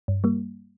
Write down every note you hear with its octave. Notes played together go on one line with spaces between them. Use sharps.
G2
G3 A#3